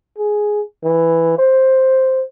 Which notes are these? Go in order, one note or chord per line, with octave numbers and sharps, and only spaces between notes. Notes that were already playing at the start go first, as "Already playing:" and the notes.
G#4
E3
C5